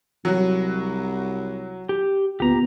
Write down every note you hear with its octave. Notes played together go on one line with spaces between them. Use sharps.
C2 F#3 F#4
G4
D2 A#2 B3 G4 A#5